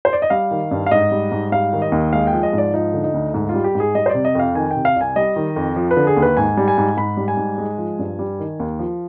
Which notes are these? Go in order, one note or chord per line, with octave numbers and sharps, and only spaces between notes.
C5
D5
D#5
G3 F5
D#3
G2
F5
G#2 D#5
G3
G#2
G3 F5
D#3
D#5
D#2
G#3 F5
G5
F3
D#5
G#2
D5
F3 D#4
D3
D#4
D2
G#2
G3 F4
G4
G#2
G#4
G3 D#5
C5
C3 D5
D#5
F2 F5
D#3 G#5
G5
C3
F5
C2 G#5
G3 D#5
D#3
F2
F3
B4
D3
G#4
D#2
B4
G#2 G#5
G3
G#5
G#2
G#2 B5
G3
G#5
G#2
G#3
F3
G2
G3
D#3
D#2
F3